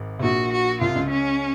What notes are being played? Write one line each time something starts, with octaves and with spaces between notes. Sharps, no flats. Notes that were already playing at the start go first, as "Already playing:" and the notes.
Already playing: G#1 G#2
C3
A#1 A#2 F#4
F#4
C2 C3 F4
C#2 C#3
C#4